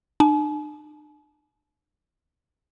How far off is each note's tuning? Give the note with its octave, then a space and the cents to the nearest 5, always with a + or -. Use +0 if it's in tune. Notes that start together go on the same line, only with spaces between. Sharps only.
D4 +45 G#5 +45